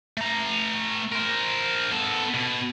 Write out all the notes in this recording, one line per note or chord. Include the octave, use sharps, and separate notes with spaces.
A3 A#5
A#4 C5
B3 A4
B2